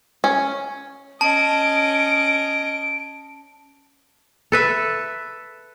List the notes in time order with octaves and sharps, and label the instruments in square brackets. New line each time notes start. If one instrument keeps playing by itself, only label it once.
[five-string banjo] C#4
[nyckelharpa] C#4 D#5 [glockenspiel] A5 [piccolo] D7
[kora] A4 B4 E5